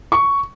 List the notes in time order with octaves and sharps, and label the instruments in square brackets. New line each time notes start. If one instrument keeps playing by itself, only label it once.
[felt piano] C#6